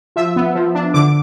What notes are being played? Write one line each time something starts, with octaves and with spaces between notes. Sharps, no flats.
F3 E5
B3
F3
D4
D3 D6